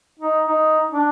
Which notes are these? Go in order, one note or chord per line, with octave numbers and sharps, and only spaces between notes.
D#4
D#4
D4